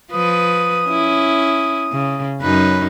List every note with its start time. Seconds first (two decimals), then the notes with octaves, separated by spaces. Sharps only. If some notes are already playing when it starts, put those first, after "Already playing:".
0.12 F3 B4 D#6
0.87 C#4 E4
1.93 C#3
2.42 F#2 C#4 D#4 B4